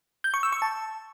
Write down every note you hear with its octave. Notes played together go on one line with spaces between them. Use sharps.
G6
C#6
E6
C#6
A5